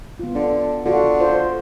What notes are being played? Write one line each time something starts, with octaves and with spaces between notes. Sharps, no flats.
B3 F4
D3 D4
D3 F4 F#4
F4 C5